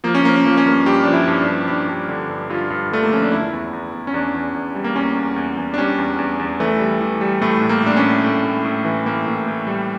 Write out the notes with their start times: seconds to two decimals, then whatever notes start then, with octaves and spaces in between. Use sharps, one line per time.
0.04 F3 A#3
0.15 C#4
0.25 F3 A#3
0.36 C#4
0.45 F3 A#3
0.58 C#4
0.66 G2 A#3
0.86 G2 G4
1.04 F3 D4
1.13 E4
1.27 G2
1.41 D4
1.48 G2
1.67 G2 D4
1.89 G2
2.09 D3
2.29 G2
2.50 G2 F4
2.70 G2
2.91 D3 A3
3.03 A#3
3.12 F3 C#4
3.22 D4
3.32 E2 E4
3.53 E2
3.73 E2
3.93 E2
4.07 C#4
4.14 E2 D4
4.34 E2
4.54 E2
4.75 G3
4.84 A#3
4.95 E2 C#4
5.17 E2
5.36 E2
5.57 E2
5.74 D4
5.78 G3 C#4
5.98 E2
6.19 E2
6.39 E2
6.60 E3 A3
6.80 G3
7.01 E3
7.21 G3
7.41 A2 A3
7.62 A2
7.69 A#3
7.83 A2 D4
7.97 C#4
8.03 A2
8.24 A2
8.44 A2
8.65 A2
8.85 E3
9.06 A2 A#3
9.26 A2
9.47 A2
9.67 G3